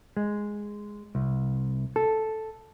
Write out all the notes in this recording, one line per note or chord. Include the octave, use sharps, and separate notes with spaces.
G#3
C2
A4